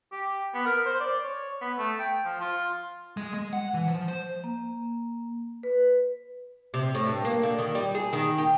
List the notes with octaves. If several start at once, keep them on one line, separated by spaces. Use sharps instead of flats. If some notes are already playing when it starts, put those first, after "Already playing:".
G4
B3
A#4
C5
D5
C#5
B3
A3
G5
F3
F4
G#3
G#3
F#5
E3
F3
C5
A#3
B4
C3
A2
G2
A#3
D3
D#3
G3
G#4
D#3
G4